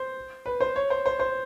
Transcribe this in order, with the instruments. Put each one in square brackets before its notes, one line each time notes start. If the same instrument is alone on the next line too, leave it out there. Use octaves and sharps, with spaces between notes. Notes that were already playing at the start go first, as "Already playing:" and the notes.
Already playing: [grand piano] C5
B4
C5
C#5
C5
C5
C5